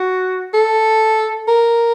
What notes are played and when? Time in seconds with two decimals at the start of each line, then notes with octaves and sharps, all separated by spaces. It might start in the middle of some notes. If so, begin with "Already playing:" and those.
Already playing: F#4
0.54 A4
1.48 A#4